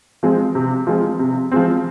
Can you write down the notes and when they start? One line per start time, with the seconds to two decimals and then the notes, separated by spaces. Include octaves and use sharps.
0.23 F3 G#3 C4
0.55 C3
0.87 F3 G#3 C4
1.19 C3
1.52 F3 G#3 C4